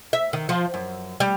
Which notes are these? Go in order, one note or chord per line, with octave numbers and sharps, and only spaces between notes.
E5
D#3
F3
F#2
G3